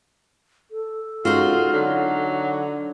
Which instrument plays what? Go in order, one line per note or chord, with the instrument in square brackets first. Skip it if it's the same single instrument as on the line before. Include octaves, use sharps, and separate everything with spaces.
[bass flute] A4
[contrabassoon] C#2 [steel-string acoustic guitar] D#4 F#4 [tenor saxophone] F4
[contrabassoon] D3 [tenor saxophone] F#3